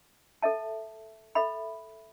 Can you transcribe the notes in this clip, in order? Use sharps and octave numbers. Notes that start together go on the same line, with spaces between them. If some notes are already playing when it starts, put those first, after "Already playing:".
A4 E5 A5
A4 E5 B5